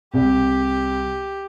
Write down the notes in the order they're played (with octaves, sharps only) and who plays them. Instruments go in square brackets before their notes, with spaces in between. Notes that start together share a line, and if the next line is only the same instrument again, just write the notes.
[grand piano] C2 [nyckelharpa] G4